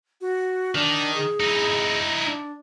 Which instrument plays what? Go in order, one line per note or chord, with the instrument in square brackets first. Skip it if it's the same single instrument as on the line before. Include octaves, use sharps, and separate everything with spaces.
[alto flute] F#4
[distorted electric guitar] D#3 [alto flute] D4
[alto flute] G#4
[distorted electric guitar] D#4 E4
[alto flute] D4